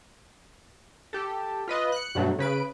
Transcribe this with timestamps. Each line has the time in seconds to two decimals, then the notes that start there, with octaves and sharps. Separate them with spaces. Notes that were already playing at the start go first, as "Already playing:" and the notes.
1.13 G4 A4
1.68 F4 B4 D#5
1.92 F#6 C#7
2.15 G2 B2 F#3 A3
2.39 C#3 B4 D7